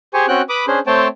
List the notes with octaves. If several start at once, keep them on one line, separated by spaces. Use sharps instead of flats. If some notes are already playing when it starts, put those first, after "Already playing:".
G4 G#4 C5 G#5 C#6
C4 C#4 F#4 G5 F#6
B4 B5 D6 D#6
C#4 D4 G#4 C5
A3 C4 C5 C#5 G5 A5